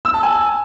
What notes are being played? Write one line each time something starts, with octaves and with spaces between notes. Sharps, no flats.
E6
A5
G#5